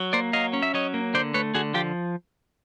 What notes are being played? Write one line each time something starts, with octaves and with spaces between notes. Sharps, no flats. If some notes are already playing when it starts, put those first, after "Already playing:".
Already playing: F#3
A#3 C5 D5
F#3 D#5 F5
C#4
E5
F#3 C#5 D#5
A#3
D3 C5 D5
A3 B4 C#5
D3 F#4 G#4
F3 F4 G4